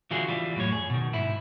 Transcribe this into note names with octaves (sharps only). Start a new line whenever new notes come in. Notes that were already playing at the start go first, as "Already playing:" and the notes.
D3 E3 F4 F#4 G#4
E3 G3 F4
F#2 A2 C#5
G#4
B2 D#3
G#2 E4